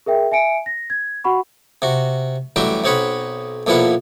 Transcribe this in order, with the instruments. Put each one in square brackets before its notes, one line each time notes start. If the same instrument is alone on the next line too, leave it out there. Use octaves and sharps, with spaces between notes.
[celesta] G#4 A#4 E5 G5
E5 G#5 C#7 D7
A#6
G#6
F#4 F#5 B5 C#6
[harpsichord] C3 F#4
A1 F#3 G3 F#4 E5 G5
B1 C4 D#4 C#5 F#5 B5
B1 A#2 F3 E4 B4 F#5